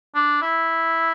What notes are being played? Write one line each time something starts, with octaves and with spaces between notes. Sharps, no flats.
D4
E4